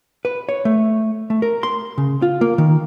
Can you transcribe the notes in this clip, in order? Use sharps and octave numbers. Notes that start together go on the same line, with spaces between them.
B4
C#5
A3
A3
A#4
C6
C#3
F4
A#3
D#3